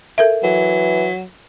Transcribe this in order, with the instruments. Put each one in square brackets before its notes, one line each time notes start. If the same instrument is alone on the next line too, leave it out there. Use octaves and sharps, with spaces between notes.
[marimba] A4 A#4 E5
[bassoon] E3 [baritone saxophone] F#3